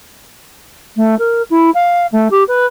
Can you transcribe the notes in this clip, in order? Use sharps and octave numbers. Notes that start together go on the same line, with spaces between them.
A3
A#4
E4
F5
A3
G4
B4